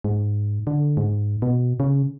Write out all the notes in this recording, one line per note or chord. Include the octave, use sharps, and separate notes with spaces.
G#2
D3
G#2
B2
C#3